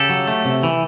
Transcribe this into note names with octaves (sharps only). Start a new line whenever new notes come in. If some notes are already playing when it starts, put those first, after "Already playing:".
Already playing: C#3 G4 A4
F#3
A3
C3
E3